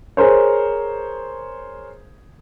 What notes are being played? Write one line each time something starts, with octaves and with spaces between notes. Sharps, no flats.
G#4 A#4 C5 C#5